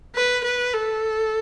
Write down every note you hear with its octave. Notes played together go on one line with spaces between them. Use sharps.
B4
B4
A4